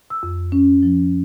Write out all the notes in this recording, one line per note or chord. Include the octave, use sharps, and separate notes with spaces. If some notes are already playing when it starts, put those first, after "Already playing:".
E6
F2
C#4
F3